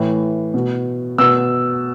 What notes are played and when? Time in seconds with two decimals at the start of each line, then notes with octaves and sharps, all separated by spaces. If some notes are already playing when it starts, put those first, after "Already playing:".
Already playing: A2 E3
0.54 B2
1.18 B2 E6